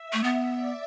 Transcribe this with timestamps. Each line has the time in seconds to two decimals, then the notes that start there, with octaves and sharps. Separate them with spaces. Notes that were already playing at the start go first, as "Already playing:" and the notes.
Already playing: E5
0.13 A3
0.24 B3
0.55 D5